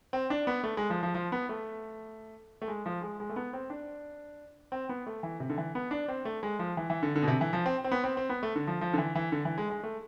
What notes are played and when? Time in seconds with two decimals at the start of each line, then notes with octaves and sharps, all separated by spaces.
0.13 C4
0.30 D4
0.47 B3
0.63 A3
0.77 G#3
0.90 F3
1.03 F3
1.15 F3
1.32 B3
1.49 A3
2.62 A3
2.68 G#3
2.86 F3
3.02 G#3
3.20 G#3
3.29 A3
3.36 B3
3.53 C4
3.70 D4
4.72 C4
4.89 B3
5.06 A3
5.23 E3
5.40 C3
5.50 D3
5.58 E3
5.75 B3
5.91 D4
6.08 C4
6.25 A3
6.43 G#3
6.59 F3
6.77 E3
6.90 E3
7.03 D3
7.15 D3
7.23 B2
7.28 C3
7.41 E3
7.53 F3
7.66 C4
7.84 C4
7.92 B3
8.04 C4
8.17 C4
8.29 B3
8.43 A3
8.56 D3
8.67 F3
8.81 F3
8.93 D3
8.98 E3
9.15 E3
9.32 D3
9.45 E3
9.58 G#3
9.70 G#3
9.83 A3